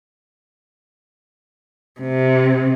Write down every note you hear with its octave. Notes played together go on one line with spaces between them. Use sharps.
C3